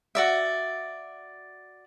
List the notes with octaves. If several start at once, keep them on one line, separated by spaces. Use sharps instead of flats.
F#4 D5 E5